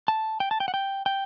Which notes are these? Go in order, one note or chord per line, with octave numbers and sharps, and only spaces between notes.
A5
G5
A5
G5
F#5
G5
G5